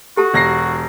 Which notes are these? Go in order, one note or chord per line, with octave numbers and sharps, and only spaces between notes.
F#4 G4 A4 A5
E1 A#6 C7